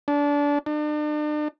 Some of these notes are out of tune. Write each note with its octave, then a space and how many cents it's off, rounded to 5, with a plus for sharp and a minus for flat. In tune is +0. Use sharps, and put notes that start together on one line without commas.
D4 -25
D4 +40